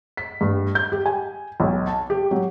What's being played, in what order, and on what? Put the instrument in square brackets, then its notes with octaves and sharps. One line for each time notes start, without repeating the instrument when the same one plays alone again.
[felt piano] B6
G2
G6
G4
G#5
B1
A5
G4
F#3